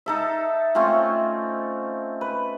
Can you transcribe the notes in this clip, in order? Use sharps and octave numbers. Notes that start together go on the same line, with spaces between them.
D#4 A4 E5
A3 C4 C#4 F4
B4